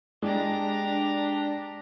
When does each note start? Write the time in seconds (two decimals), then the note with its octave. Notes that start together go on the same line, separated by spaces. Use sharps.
0.22 G#3 D4 G4 A#5